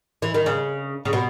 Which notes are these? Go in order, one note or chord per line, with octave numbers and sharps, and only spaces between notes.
E3
D#3
C#3
C#3
B2